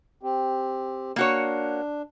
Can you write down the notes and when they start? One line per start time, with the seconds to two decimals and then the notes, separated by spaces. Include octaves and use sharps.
0.23 C4 G4
1.16 A#3 D4 F#4 C#5